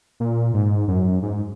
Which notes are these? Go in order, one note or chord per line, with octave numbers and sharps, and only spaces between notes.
A#2
G#2
F#2
G#2